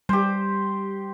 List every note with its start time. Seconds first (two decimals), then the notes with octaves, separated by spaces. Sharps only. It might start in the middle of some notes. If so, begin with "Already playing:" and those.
0.09 G3 G4 C5